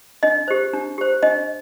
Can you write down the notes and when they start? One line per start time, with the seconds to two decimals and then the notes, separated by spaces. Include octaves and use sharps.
0.23 D4 D#5
0.48 G4 C5
0.73 D4
0.98 G4 C5
1.23 D4 D#5